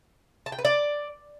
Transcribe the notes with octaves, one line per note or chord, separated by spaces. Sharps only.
A5
G5
B4
D5